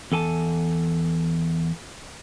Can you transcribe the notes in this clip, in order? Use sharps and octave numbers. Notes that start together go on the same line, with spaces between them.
E2 A4 G#5 A5